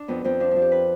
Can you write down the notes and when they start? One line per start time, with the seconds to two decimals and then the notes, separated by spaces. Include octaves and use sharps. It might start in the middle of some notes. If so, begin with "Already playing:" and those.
Already playing: D4
0.08 F2 B3
0.24 F2 C4
0.40 F3 D4
0.51 F3 D4
0.62 G4
0.72 B4